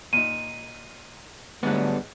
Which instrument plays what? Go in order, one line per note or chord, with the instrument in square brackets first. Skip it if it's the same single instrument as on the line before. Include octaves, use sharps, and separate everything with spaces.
[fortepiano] A#2 D#4 [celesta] D#7
[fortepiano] G#2 F#6 [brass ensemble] D3 F#3 A3 [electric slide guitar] G3 B3